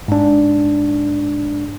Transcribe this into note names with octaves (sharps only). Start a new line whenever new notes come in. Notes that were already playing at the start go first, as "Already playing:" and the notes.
G#2 D4